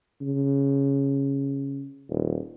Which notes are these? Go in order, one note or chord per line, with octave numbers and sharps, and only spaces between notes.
C#3
D#1